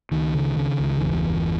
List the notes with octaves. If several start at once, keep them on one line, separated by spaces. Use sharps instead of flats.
C#2 D#3
C#3
C#3
C#2
D#3
G1 E2 E3
G1